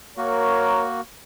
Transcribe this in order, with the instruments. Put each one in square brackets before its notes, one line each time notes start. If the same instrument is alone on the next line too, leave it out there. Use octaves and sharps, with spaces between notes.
[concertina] A#3 F#4 [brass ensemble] A#4 C#5